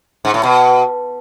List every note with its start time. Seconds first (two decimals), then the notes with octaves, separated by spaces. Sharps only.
0.25 G#2
0.34 A2
0.43 B2